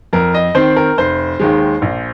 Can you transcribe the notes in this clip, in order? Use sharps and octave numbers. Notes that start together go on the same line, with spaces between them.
F2 A#4
D#5
D#3 C4 C5
A#4
F1 C5
D#2 D#3 G#3
A#1